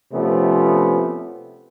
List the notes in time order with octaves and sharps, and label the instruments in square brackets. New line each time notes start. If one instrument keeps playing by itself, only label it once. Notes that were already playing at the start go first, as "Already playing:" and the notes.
[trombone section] C3 F3 A3 B3 C#4